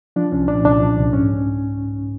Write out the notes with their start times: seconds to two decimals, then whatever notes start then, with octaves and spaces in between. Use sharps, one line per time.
0.16 F3 D4
0.32 C2 C#4
0.48 A#2 D4
0.65 C2 D4
0.80 F3
0.97 C2
1.12 G#2 C#4